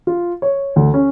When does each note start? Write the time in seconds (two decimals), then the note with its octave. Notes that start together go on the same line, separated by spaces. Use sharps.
0.07 F4
0.42 C#5
0.76 D2
0.94 C#4